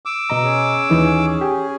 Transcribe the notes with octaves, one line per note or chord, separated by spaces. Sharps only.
D6 E6
B2 D#5 A#5
C#4 G#4
D#2 E3 D#4
G4